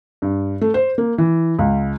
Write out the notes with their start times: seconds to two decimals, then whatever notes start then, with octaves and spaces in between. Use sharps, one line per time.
0.22 G2
0.61 A3
0.74 C5
0.98 A#3
1.18 E3
1.59 C#2